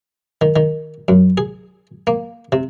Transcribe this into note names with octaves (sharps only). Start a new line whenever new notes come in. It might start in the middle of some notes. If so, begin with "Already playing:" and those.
D#3
D#3
F#2
G#4
A#3
C3